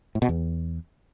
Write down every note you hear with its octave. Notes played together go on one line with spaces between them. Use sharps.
A2
B2
E2